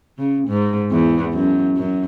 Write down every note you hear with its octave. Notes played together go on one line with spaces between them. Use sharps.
C#3
G#2
E2
F#2
F#2